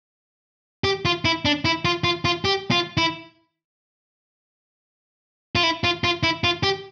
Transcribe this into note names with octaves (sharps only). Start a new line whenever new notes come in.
G4
F4
E4
D4
E4
F4
F4
F4
G4
F4
E4
F4
E4
F4
F4
E4
F4
G4